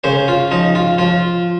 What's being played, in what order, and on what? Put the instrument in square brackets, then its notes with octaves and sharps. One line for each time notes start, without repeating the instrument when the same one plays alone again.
[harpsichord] C#3 C5
F4
F3 D#4
F4
F3 F4